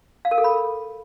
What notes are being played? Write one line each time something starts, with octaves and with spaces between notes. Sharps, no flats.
F5
A#4
A4
B5